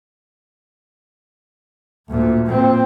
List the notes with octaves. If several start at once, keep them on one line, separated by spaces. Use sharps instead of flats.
D2 A#2
A#2 C4